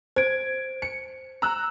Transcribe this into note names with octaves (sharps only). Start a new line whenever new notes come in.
C5 G#6 D7
C#7
A#5 E6 F#6